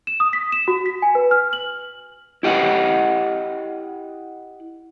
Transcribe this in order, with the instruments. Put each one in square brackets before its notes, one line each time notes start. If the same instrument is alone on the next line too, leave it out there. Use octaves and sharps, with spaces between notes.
[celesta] E7
D#6
B6
E7
F#4
B6
G#5
B4
F6
F#7
[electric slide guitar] E4 G4 D#5 F#5